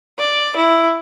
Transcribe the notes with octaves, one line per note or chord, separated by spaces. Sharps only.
D5
E4